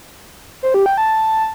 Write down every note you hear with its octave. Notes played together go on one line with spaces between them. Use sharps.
C5
G4
G5
A5